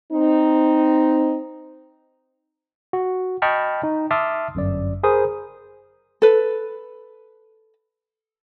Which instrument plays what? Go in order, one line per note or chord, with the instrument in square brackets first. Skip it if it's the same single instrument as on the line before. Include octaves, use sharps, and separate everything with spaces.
[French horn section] C4 D#4
[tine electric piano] F#4
D#5 G5 A5 B5 C#6 F6
D#4
E5 A5 C6 D6 D#6 F6
G1 F#2 D5
G#4 A#4 C5 B5 D#6
[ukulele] A4 B4